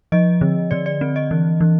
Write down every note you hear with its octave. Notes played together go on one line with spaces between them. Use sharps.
F3 D#5
D3
D3 D5
D5
C4
D#5
E3
E3